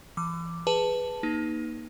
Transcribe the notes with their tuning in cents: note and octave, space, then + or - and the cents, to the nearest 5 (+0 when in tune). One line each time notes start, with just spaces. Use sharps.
E3 +35 D6 +0
G#4 +0 B4 +0 A5 +0
A#3 +25 D#4 +0